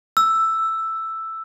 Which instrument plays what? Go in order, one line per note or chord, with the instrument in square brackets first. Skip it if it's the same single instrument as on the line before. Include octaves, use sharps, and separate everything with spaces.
[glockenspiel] E6